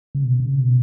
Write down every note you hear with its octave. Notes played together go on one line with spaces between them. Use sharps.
C#3
B2
B2
C#3
B2